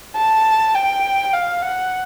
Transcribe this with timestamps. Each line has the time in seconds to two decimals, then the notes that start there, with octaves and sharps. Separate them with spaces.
0.16 A5
0.75 G5
1.33 F5
1.62 F#5